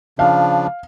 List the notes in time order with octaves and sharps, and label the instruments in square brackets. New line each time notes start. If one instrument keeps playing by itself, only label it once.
[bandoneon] C#3 F3 D4 [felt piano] F5